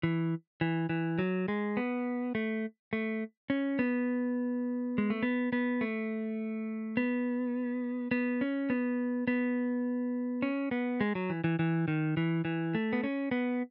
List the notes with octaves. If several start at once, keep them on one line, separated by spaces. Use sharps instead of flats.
E3
E3
E3
F#3
G#3
B3
A3
A3
C#4
B3
G#3
A3
B3
B3
A3
B3
B3
C#4
B3
B3
C#4
B3
G#3
F#3
E3
E3
E3
D#3
E3
E3
A3
B3
C#4
B3